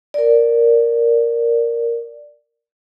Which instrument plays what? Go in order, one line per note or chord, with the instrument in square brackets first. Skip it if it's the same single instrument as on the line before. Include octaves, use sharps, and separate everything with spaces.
[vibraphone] A#4 D5